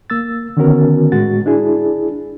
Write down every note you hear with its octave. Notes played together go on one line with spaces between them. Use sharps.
A#3 E6 A6
D3 D#3 B3 C#4 F#4 A#4
A2 G#3 F#4 A6
D4 E4 G#4